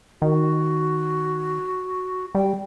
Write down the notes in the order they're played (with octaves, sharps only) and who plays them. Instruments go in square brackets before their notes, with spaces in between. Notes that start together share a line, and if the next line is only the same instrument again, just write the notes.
[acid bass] D#3 [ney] F#4
[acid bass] G3 [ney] G5